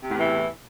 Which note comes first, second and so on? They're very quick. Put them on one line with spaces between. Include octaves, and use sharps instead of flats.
C3 A2 E2 E3